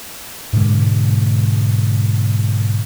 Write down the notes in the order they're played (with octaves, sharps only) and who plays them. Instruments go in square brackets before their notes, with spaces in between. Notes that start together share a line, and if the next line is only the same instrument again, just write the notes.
[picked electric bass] G#2 B2 D3 G#3